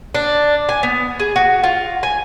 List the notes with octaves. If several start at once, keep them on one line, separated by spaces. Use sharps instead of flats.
D4
G#5
B3
G#4
F#4
F4
G#5